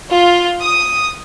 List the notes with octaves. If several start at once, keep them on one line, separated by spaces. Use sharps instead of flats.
F4
D#6